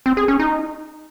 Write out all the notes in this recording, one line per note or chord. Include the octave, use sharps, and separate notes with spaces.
C4
G#4
C#4
D#4